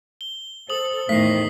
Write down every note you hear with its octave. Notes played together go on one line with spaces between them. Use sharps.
G7
A4 C5 D#6 F#7
E2 A2 D#3 A3 B6 C7